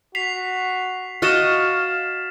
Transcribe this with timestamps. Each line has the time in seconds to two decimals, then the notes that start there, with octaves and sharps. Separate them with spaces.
0.15 F#4 B6 C7 F7
1.22 F#4 D#5 F5 F6 A6 E7